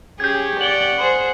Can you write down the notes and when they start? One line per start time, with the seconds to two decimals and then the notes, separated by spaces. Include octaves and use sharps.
0.20 C#4 G4 G#4 G6 G#6
0.61 D5 F#5 F#7 G7
0.99 G#4 C5